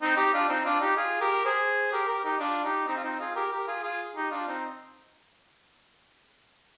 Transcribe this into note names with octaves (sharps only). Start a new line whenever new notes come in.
C4 D#4
D#4 G4
D4 F4
C4 D#4
D4 F4
D#4 G4
F4 G#4
G4 A#4
G#4 C5
G4 A#4
G4 A#4
D#4 G4
D4 F4
D#4 G4
C4 D#4
F4
C4 D#4
F4 G#4
G4 A#4
G4 A#4
F4 G#4
F4 G#4
D#4 G4
D4 F4
C4 D#4